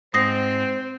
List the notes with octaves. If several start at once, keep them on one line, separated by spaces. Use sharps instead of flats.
G#2 C4 C5 D#6 A#6 C7